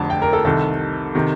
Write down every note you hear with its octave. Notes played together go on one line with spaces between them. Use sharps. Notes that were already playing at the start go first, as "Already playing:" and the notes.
Already playing: F1 F2 D3 A5
G5
A#4
A4
C2 C3 D#3 A4
C3 D#3